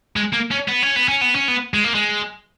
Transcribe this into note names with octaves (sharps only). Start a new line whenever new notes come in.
G#3
A#3
C#4
B3
C#4
B3
C#4
B3
C#4
B3
G#3
A#3
G#3